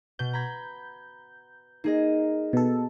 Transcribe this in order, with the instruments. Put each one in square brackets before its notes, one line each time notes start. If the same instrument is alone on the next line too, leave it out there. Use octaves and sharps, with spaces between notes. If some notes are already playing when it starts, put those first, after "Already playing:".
[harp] B2 [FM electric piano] G6
[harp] A#5 B5 G#6
[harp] A#3 G#4 D#5 [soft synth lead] D#4
[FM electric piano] B2 A4